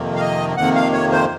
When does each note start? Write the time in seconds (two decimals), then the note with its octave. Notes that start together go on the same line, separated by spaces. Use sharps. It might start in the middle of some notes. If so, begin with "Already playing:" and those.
Already playing: F2 C3 D#3 A#3
0.16 F5
0.20 D#5
0.57 F2 C3 D#3 A#3 F#5
0.75 F5
0.93 C#5
1.12 C5